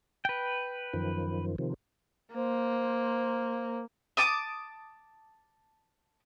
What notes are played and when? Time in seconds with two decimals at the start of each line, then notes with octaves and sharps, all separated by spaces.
0.25 B4 G5
0.93 F#2 D#3 F3
1.58 C3 D#3 F3
2.35 A#3 C5
4.17 A5 D6 D#6